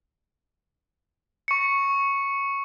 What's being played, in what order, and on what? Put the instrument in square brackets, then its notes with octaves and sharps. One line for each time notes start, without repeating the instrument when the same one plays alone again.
[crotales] C#6 C#7